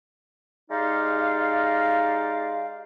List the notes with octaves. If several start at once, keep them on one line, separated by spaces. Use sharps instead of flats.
G#3 D#4 G4 D5 F5